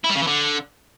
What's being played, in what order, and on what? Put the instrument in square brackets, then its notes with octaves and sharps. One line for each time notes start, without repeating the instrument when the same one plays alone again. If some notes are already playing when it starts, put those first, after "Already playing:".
[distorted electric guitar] E4
G3
C#3
E3
D3